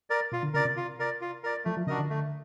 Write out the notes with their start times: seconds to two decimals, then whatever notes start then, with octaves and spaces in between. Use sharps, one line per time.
0.10 A#4 D5
0.32 B2 F4
0.43 D3
0.54 C#3 A#4 D5
0.65 C3
0.77 F4
0.99 A#4 D5
1.21 F4
1.44 A#4 D5
1.65 F3 A3
1.77 F3
1.87 C#3 D4 F#4 A#4 D#5
1.99 D3
2.10 A3